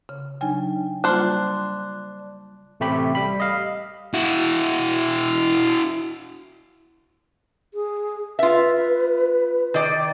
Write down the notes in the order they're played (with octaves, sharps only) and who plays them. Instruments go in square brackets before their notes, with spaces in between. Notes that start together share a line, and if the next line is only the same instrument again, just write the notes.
[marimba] C#3
[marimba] C#3 F#3 G#5 [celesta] D4 D#4 G5
[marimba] G3 A#3 F4 [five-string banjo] D4 C5 [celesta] F#6
[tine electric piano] A1 C3 A3 G4 B5
G3 B5
D#5 F5
[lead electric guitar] E4 F#4
[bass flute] G#4
[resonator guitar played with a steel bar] F4 E5 [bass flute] B4
[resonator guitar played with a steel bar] D#3 D5